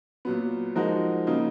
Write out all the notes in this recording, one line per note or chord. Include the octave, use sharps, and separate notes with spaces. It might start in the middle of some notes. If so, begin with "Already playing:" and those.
A#2 F#3 B3
F3 G#3 D#4 F#4 A#4
C#3 F#3 A#3 D#4